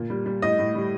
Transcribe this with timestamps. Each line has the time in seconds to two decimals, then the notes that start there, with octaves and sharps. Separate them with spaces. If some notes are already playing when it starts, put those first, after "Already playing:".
Already playing: A#2
0.10 G3
0.26 G3
0.42 A2 D#5
0.59 A2
0.75 G3